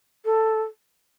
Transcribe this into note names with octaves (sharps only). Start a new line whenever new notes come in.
A4